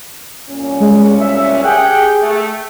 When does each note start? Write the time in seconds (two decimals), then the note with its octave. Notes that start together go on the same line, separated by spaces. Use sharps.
0.49 C2 A#2 C#4
0.80 G#3
1.20 E5
1.65 G4 G#4 F#5 G5
2.22 A3